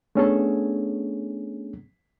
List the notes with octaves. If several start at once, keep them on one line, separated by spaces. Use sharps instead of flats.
A3 B3 C#4 D4 G#4 A4